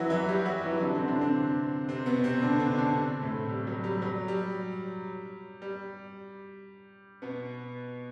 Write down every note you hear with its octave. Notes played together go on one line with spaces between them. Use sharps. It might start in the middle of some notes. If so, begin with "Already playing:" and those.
Already playing: E3 F#3 E4 F#4
E3 E4
G3 G4
F#3 F#4
E3 E4
E4
D3 D4
C3 C4
D3 D4
C3 C4
C3 C4
B2 B3
C3 C4
D3 D4
D3 D4
D3 D4
C3 C4
A2 A3
G3
F#3
G3
F#3
G3
G3
B2 B3